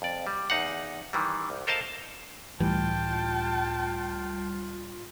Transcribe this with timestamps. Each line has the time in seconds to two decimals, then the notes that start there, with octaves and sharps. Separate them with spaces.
0.02 F2 D5
0.27 G3
0.50 E2 D#4 F5 F#5
1.13 D#3 E3 G3
1.50 C2
1.67 A4 A#4 C5 D#5 F5 A5
2.60 C#2 A2 E3 G3 F4 G5 A5